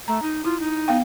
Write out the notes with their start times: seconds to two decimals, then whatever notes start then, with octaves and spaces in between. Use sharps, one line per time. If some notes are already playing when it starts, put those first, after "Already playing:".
0.08 A3 A#5
0.22 D#4
0.45 E4 F4
0.60 D#4
0.88 B3 F5 G5